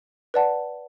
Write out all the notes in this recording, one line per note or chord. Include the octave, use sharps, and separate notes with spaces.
B4 D5 F#5 A5